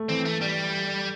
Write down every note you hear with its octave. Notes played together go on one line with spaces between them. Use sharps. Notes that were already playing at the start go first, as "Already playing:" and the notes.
Already playing: A3
E3 C4
A3
G3